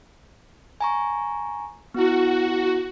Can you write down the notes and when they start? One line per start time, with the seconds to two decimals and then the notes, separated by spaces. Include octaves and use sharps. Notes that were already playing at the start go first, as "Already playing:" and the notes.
0.81 G#5 A#5 C#6
1.94 B3 E4 F#4